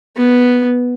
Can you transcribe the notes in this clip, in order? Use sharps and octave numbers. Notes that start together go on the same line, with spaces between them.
B3